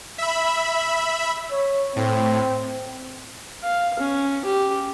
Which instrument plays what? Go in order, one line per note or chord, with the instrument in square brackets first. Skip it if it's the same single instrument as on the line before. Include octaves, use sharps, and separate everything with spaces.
[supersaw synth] E5 B5
[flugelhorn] C#5
[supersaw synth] A2 [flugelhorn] C4
[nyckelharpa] F5
C#4
G4